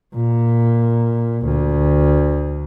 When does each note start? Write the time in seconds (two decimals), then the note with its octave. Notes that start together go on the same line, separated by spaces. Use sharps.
0.14 A#2
1.45 D2